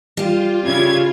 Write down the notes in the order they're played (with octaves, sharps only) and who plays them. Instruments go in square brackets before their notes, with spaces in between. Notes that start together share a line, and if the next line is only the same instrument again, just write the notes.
[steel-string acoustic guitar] G3 G4 [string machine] F4
[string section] C#3 E4 G#6